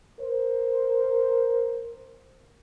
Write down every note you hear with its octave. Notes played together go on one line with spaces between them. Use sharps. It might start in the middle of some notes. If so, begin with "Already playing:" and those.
A#4 C5